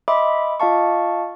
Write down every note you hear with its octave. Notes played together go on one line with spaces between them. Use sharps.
D#5 E5 G5 B5 C6 D6
F4 D#5 F5 A5 C#6